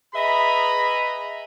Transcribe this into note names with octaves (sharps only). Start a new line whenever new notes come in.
G#4 B4 D#5 E5 A#5 B5